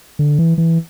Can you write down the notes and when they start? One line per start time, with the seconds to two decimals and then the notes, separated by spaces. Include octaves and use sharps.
0.19 D3
0.39 E3
0.58 E3